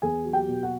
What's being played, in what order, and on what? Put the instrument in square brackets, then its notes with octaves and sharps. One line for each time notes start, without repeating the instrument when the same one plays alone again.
[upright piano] E2 G#4 G#5
F#3
G4 G5
B2
F#4 F#5